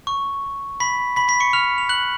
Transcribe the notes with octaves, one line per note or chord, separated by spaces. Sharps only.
C#6
B5 B6
B5 B6
B5 B6
C#6 C#7
F6 F7
F7
F#6 F#7